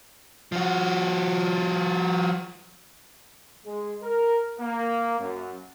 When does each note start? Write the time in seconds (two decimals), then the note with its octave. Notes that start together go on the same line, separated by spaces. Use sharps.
0.52 F3 F#4
3.65 G#3
4.03 A#4
4.59 A#3
5.20 F#2